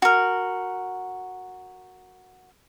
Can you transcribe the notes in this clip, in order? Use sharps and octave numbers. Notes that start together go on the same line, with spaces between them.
F#4 A#4